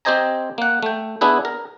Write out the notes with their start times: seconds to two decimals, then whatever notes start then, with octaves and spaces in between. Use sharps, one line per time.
0.05 C4 G4 C5 D#5 G#5 A#5
0.58 A#3 F#5
0.83 A3 G5
1.21 B3 D4 E4 G#4 B4
1.45 A#4